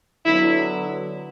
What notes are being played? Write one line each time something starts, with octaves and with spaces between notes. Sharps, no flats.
D3 F#3 B3 E4